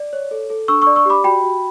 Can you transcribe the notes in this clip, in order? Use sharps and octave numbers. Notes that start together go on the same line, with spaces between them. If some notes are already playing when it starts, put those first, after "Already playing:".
Already playing: D5
C#5
A4
A4
D4 C#6 E6
C#6 E6
D5
C#6 E6
G4 B5 D6
F#4 G5 B5
F#4